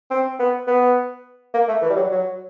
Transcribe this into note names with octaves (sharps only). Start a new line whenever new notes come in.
C4
B3
B3
A#3
A3
E3
G3
F#3
F#3